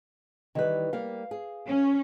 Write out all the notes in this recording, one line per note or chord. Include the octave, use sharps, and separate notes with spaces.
D#3 E3 G3 E4 B4
G3 A#3 F5
G#4
C#4